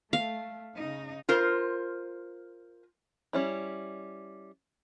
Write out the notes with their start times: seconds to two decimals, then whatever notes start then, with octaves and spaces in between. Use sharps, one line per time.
0.13 A3 F5
0.75 C#3 D#4
1.29 F4 A#4 C5
3.33 G3 C#4 E4